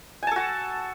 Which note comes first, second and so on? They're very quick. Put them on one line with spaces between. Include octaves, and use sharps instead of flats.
G#5 A5 A4 F#4